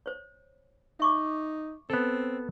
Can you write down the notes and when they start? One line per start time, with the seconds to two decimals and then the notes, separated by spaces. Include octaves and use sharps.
0.06 C5 C#5
1.00 D#4 E5 C#6 D6
1.90 B3 C4 A4